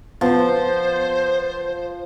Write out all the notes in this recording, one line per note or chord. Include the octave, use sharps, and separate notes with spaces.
F3 B3 C5